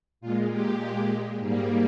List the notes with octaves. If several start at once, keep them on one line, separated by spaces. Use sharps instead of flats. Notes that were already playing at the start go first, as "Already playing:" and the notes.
A#2 G#3 F4
G4
G#2 G3 A#3